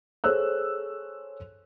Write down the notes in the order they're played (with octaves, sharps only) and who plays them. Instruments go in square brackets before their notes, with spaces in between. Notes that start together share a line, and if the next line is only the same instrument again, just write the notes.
[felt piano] G#4 A4 C5 C#5 E6 F#6